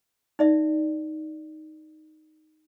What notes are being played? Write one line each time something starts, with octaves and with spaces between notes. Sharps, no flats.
D#4 D5 E5